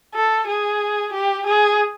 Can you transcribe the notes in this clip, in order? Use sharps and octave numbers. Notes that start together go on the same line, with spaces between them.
A4
G#4
G4
G#4